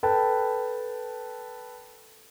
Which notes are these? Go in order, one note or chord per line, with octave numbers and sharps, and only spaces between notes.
A4 B4 G5 A5